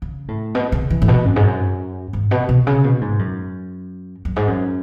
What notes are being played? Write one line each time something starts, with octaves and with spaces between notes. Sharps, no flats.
C#3
A2
B2
C#3
E3
A2
B2
F#2
G#2
F#2
G#2
B2
B2
C#3
B2
G#2
F#2
F#2
G#2
F#2